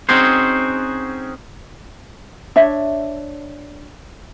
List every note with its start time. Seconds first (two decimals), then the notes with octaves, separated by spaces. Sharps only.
0.09 C4 C#4 D#4 F#4 G#4 C5
2.56 D4 C#5 E5